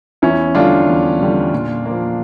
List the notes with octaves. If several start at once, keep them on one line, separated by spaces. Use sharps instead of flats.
E2 C#4 E4
D3 G3 D4 F4
E2
D3 G3
A#2
F3 A#3